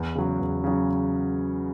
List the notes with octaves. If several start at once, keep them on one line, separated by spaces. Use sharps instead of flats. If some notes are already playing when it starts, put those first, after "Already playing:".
Already playing: E2
C#3 F#3
E2
C#3 F#3